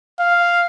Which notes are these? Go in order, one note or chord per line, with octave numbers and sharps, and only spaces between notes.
F5